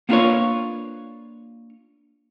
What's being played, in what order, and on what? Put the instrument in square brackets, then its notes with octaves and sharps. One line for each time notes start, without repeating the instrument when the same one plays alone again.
[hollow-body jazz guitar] A#3 B3 D4 F4 B4 C#5